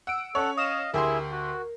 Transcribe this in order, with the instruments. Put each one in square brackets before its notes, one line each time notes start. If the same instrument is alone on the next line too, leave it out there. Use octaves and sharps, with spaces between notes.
[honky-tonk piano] F#5 [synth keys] E6 D7
[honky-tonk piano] C#4 C#5 [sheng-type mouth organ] A4 F#5
[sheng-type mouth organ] D#5 F5 [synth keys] D#6 E7
[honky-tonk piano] D2 G4 C6 [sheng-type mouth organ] E4 G#4 E5 [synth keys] A#4
[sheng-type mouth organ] F#4